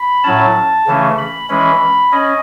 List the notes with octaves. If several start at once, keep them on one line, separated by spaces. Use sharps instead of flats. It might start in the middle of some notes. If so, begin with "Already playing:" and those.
Already playing: B5
A2 F#3 C#4 A5
C#3 E3 A3 C#4
B5
E3 G#3 C#4 B5
C#4 D#5